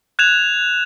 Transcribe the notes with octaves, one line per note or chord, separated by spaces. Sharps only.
F#6 G#6 E7 F7